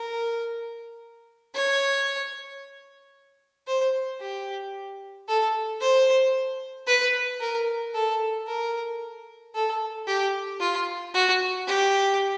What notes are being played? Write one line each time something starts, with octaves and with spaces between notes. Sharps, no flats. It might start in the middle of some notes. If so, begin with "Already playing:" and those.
Already playing: A#4
C#5
C5
G4
A4
C5
B4
A#4
A4
A#4
A4
G4
F4
F#4
G4